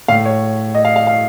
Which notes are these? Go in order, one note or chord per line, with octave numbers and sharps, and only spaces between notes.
A2 F5
C#5
D#5
F5
F5
F5